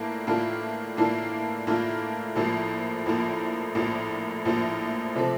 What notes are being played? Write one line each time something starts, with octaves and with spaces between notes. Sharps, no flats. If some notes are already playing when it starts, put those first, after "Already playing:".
Already playing: A2 E3 A#3 D4 F4
A2 E3 A#3 D4 F4
A2 E3 A#3 D4 F4
A2 E3 A#3 D4 F4
A#1 A2 F3 A#3
A#1 A2 F3 A#3
A#1 A2 F3 A#3
A#1 A2 F3 A#3
C3 F3 A3 C4